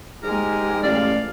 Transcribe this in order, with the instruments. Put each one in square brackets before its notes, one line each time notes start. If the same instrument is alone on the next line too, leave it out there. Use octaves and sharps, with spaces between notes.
[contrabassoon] G#2 [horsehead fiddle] G#3 G4 [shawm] A#4
[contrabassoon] A1 [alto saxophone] D5 [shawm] F5